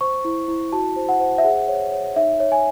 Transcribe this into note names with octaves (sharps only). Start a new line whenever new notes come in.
C5 C#6
E4
E4
F#4 A5
C5
F#5
C5
E5
G#4 F#5
C#5
C#5
D#4 E5
C#5
G#5